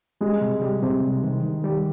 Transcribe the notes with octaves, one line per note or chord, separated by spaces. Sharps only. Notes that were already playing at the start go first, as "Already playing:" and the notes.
G3 G#3
C3
G3
C3
G3
D#3
D#3
G3